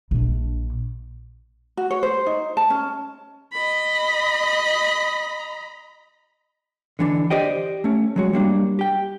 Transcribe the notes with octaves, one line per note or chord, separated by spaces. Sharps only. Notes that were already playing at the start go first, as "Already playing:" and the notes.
A#1 D4
F#4
C#5
C5
D#4
A5
C#4
D#5 B5
D3 E3 D4
G4 C5 D5 D#5 G5
A3 C#4
F#3 G#3 F#4
G3 A#3 D4
G4 G5